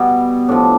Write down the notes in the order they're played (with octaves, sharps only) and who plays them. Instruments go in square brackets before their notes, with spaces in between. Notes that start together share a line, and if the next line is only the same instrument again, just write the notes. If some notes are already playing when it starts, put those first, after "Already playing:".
Already playing: [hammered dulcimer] B2 G3 B3
A2 F3 D4